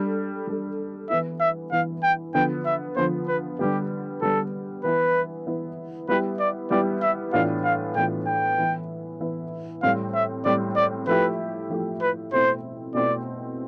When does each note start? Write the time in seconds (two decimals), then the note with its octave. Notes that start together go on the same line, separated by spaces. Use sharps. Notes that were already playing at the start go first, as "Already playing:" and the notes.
Already playing: G3 D4 A4
0.47 G3 D4 A4
1.09 E3 B3 E4 E5
1.40 E5
1.72 E3 B3 E4 F5
2.03 G5
2.34 D3 F3 B3 G5
2.66 E5
2.97 D3 F3 B3 C5
3.28 B4
3.59 D3 G3 B3 G4
4.22 D3 G3 B3 A4
4.84 E3 B3 E4 B4
5.47 E3 B3 E4
6.09 G3 B3 E4 G4 B4
6.40 D5
6.71 G3 B3 E4 G4 D5
7.02 E5
7.33 A2 E3 B3 D4 F4 F5
7.64 F5
7.96 A2 E3 B3 D4 F4 G5
8.27 G5
8.58 E3 B3 E4
9.20 E3 B3 E4
9.83 A2 G3 C4 F5
10.14 E5
10.45 A2 G3 C4 D5
10.76 D5
11.07 F3 A3 E4 G4 B4
11.70 F3 A3 E4 G4
12.01 B4
12.33 B2 A3 C4 E4 C5
12.94 B2 A3 C4 E4 D5